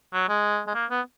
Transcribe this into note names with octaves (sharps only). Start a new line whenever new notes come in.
F#3
G#3
G#3
A#3
B3